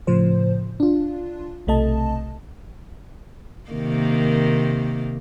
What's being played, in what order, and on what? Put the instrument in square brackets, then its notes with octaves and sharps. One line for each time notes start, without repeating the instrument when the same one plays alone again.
[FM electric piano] A2 C#3 F3 C5
D4 F4
B1 C3 A3 D#5 A5
[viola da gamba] C3 D#3 A#3